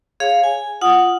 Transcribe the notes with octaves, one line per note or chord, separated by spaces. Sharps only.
G#4 C#5 F5
G#5
F4 F#5 D#6